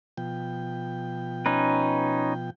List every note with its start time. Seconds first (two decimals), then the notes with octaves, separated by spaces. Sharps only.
0.18 B2 F3 G5
1.46 C#4 D#4 B4